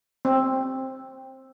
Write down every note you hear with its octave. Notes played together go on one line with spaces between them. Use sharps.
C4